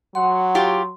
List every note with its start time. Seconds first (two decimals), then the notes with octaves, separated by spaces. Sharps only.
0.15 F#3 F#5 C6
0.55 F4 G4